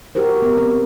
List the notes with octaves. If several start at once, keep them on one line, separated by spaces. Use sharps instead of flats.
F#4 G4 A#4 C5
B3 A#4
B3 C4